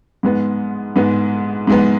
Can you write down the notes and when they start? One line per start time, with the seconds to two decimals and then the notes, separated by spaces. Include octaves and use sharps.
0.23 G#2 G#3 B3
0.96 G#2 G#3 B3
1.67 G#2 G#3 B3